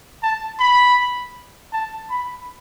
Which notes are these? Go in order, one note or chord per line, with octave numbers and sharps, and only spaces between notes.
A5
B5
A5
B5